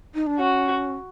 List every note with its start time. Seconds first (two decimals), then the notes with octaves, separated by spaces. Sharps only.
0.15 D#4
0.27 D4
0.39 C#4 F#4